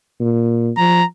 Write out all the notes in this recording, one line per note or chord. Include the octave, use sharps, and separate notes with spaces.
A#2
F3 A#5